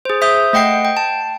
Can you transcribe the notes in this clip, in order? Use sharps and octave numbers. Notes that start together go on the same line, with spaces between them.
G#4 C5
C5 E5 D#6 G6
A3 D#5 F#5 G5 C7
G5
A5